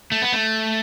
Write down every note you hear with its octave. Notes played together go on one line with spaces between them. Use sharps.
A3
B3
A3